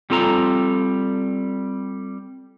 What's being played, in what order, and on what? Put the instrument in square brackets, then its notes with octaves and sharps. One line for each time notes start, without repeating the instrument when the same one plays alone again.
[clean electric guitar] G3 C4 F4 A4 A#5